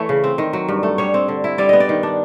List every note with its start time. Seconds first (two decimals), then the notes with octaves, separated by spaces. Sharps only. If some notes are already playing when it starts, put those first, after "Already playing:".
Already playing: E3 A3 C#5
0.09 C#3
0.24 C4
0.38 D#3
0.53 F#3
0.69 G2
0.83 A3
0.98 G3 C#5
1.14 C4
1.28 D3
1.44 E4
1.58 G3 D5
1.69 B3 D#5
1.80 D5
1.89 D#3
2.03 D4